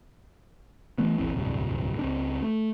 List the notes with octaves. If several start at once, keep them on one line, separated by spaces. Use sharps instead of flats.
E3 A3 B3
D#1 G#1 E3 C4
D1 C2 G2 C3
C#2 C4 D4
A3